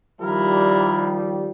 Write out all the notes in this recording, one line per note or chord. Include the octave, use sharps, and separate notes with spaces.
D#3 F3 G3 E4 A#4